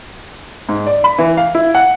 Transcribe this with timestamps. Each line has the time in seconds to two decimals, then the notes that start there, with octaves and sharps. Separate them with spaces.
0.69 G#2
0.86 D5
1.04 B5
1.18 E3
1.37 F5
1.55 E4
1.75 F#5